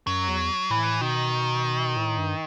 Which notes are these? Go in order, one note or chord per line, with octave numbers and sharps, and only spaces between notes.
F#2 F#3
E2
A2 E3
B2 D#3
A2
G2